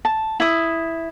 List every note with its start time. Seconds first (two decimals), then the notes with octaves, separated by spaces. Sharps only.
0.05 A5
0.40 E4 D#6